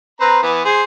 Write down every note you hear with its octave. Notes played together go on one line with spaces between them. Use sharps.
C4 B4 A#5
E3 B3
G#4 C5